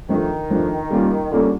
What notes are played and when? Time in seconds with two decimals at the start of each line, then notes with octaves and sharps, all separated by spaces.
0.09 D#3 F3 A3 D4
0.50 F3 A3 D4
0.90 G3 A#3 C#4 F4
1.31 D3 G3 A#3 C#4 F4